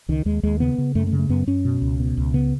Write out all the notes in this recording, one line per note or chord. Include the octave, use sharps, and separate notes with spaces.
C#2 D#3
D#2 G#3
D#2 G#3
C#3 B3
C#3
F#2 A3
A3
C#3
A3
F#2 B3
F#2 C#4
B2
C#2
B2
C#2
C#3 B3